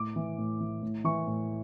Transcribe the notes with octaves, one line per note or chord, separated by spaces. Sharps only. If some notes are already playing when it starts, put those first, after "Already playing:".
Already playing: A2 D6
E3
A2
E3
A2
E3 C#6
A2